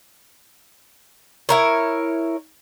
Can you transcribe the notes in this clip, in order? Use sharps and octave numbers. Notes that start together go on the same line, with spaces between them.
E4 A#4 C#5